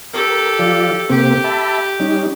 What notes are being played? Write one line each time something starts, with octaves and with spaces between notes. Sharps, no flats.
G4 A4 A#4
F3 F4 D5
C3 A#3 C4 G4
E5 A5 B5
G3 C#4 D#4